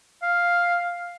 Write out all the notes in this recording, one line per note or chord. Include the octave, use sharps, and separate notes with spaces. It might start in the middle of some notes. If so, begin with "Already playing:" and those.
F5